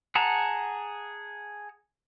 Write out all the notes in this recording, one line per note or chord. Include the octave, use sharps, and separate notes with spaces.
G#4 F#5 A5 A#5